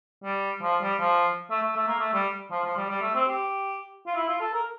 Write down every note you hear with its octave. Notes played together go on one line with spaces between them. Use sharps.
G3
F3
G3
F3
A3
A3
A3
A#3
A3
G3
F3
F3
G3
G3
A3
C4
G4
F4
E4
F4
A4
A#4